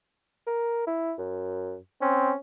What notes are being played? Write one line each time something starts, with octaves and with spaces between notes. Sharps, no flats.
A#4
E4
F#2
C4 C#4